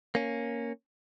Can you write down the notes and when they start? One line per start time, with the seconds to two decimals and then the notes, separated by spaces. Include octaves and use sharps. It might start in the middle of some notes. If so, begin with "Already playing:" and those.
0.15 A#3 C#4